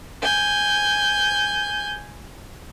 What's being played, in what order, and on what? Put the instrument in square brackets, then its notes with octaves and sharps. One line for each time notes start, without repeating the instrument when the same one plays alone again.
[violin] G#5 G6